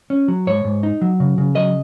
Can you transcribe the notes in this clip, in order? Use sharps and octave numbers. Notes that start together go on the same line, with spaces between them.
C#4
F#3
G#2 C#5
G#2
D#4
F#3
C#3
C#3
F#3 D#5